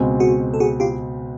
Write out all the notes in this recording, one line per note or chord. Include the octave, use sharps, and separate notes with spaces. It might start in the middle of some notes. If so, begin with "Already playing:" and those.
Already playing: C#2 B2 G#3 C4
F#4 G#4
A4
F#4 G#4
F4 G4